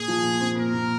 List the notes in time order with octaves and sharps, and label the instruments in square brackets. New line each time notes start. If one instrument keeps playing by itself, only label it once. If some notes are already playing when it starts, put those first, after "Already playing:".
Already playing: [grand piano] A#2 [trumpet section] G#4
[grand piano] F3
A#2
C4
[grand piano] A#2 [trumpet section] A#4
[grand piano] A#2